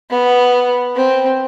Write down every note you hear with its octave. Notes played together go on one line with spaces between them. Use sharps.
B3
C4